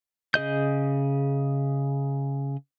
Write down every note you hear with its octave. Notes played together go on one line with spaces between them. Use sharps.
C#3 G#4 D#5 G6